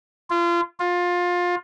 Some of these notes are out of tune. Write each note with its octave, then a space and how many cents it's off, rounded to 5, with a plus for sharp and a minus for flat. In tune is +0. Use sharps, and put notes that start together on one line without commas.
F4 -30
F4 +20